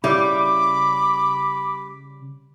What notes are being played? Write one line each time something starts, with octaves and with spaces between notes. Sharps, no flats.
C#3 G3 E4 B5 D6